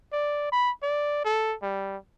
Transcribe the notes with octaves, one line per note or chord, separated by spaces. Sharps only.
D5
B5
D5
A4
G3